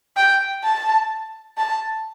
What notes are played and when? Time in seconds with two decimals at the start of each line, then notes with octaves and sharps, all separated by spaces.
0.17 G5
0.64 A5
1.57 A5